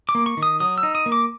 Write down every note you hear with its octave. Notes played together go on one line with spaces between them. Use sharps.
D6
A#3
C#6
D#3
D#6
F#3 D#6
E6
D#4
D#6
A#3
D6